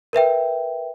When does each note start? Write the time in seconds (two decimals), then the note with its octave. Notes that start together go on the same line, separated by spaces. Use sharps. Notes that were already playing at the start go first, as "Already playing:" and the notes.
0.13 A#4 B4 E5 G5